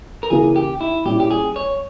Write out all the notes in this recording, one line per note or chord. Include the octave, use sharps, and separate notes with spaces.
A#4
C#3 E3 A#3 G#4
G4
E4
A#2 G3 C#4 E4 G4
G4
G#4
C#5